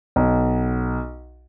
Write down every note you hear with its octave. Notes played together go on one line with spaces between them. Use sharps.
B1